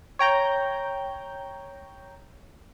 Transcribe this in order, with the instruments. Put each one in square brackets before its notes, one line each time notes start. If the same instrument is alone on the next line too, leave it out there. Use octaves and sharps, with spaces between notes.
[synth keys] C#5 G5 A#5 G6